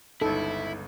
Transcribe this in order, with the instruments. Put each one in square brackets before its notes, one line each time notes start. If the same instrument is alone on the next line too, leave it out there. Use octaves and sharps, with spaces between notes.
[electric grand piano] G1 C#2 [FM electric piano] D#4 [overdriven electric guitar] E4 [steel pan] A4